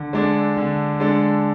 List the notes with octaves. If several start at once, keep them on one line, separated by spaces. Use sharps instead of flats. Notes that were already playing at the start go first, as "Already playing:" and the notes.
Already playing: D3
G#3 D4 A4
D3
G#3 D4 A4